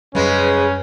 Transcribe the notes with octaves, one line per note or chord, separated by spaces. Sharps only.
F#2 C#3 G3 G#3 C#4 B4